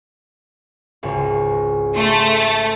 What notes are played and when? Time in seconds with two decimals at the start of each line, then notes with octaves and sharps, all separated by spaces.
1.03 G#1 C#2
1.95 A3 C6